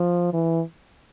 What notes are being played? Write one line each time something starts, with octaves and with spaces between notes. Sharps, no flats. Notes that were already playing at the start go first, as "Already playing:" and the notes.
Already playing: F3
E3